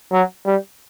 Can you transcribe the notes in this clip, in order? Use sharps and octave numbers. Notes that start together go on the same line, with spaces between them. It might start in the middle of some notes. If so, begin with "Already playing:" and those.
F#3
G3